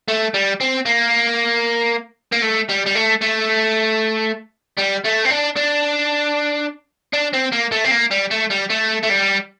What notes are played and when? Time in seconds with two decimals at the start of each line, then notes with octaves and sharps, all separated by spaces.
0.08 A3
0.34 G3
0.61 C4
0.86 A#3
2.32 A#3
2.42 A3
2.70 G3
2.86 G3
2.96 A3
3.22 A3
4.77 G3
5.04 A3
5.25 C4
5.30 D4
5.57 D4
7.13 D4
7.33 C4
7.52 A#3
7.72 A3
7.84 C4
7.91 A#3
8.11 G3
8.31 A3
8.50 G3
8.70 A3
9.03 A3
9.10 G3